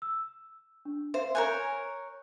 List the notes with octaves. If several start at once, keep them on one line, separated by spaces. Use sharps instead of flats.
E6
D4
C5 E5 F5
A#4 C#5 G#5 F#6 G6